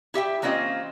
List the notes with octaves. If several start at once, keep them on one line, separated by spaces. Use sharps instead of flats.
E4 G4 E5 G5
E3 A#3 C4 C#4 F4 D#5